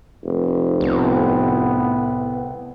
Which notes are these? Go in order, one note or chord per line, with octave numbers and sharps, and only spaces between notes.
F1
C2 A2 A3 B3